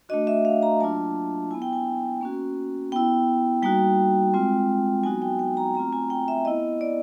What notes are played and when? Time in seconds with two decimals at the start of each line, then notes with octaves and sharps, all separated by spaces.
0.09 A3 D4 F#4 D#5
0.27 E5
0.45 F5
0.63 A#5
0.80 F#3 A#3 D4 F4 A5
1.51 B3 E4 G#5
1.62 G5
1.73 G#5
2.21 A#3 C#4 F#4
2.92 B3 E4 G5
3.62 G3 A#3 D#4 F#4 G5
4.34 G#3 C4 F4
5.04 F#3 B3 D#4 F#4 G#5
5.22 G5
5.39 G5
5.57 A#5
5.75 A3 C4 F4 A#5
5.93 G#5
6.10 G5
6.28 E5
6.45 B3 E4 D#5
6.81 D5